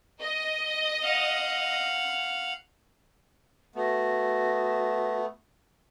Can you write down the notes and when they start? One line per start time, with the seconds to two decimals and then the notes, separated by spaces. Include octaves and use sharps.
0.20 D#5
1.03 F5 F#5
3.76 A3 B3 F#4